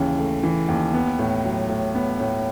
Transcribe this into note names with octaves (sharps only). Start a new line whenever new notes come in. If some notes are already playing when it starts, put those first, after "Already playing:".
Already playing: D#2 C#3 E3
A3
E3
D#2
B3
A2
F#3
A2
B3
A2